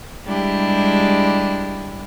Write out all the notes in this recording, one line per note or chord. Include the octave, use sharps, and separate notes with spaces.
G3 G#3 D4 E4 G4